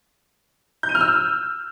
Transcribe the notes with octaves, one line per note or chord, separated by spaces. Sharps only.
G6
D#7
F6
E6